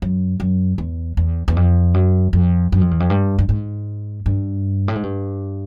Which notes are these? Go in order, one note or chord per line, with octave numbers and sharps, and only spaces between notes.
F#2
F#2
E2
E2
E2
F2
F#2
F2
F#2
F2
E2
F2
G2
G2
G#2
G2
A2
G#2
G2